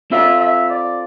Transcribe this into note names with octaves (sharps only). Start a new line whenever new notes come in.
C4 F4 A4 C5 E5 F5
E5
D5